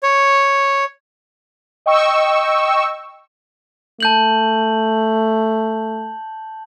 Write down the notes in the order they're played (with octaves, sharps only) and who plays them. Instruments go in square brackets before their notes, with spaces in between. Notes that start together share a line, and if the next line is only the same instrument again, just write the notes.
[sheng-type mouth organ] C#5
[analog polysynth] D#5 G5 C#6 E6
[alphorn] A3 [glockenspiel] A5 G6 F#7